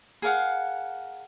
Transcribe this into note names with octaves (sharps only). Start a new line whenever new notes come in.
G#4 A#4 F5 F#5